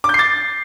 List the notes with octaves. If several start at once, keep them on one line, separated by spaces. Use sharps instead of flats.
D6
G6
C7
A6